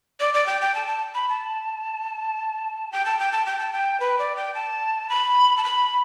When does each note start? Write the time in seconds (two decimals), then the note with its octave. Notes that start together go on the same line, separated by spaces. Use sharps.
0.20 D5
0.34 D5
0.46 G5
0.61 G5
0.75 A5
0.87 A5
1.15 B5
1.29 A5
2.92 G5
3.05 A5
3.19 G5
3.32 A5
3.46 G5
3.59 A5
3.73 G5
4.00 B4
4.19 D5
4.36 G5
4.55 A5
5.09 B5
5.57 A5
5.64 B5